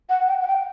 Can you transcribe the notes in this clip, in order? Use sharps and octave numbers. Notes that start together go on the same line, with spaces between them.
F#5
G5
F#5
G5